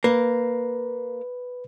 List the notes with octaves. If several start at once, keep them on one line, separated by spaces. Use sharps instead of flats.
A#3 B4